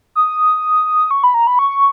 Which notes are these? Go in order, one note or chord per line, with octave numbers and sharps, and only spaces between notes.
D#6
C#6
B5
A#5
B5
C#6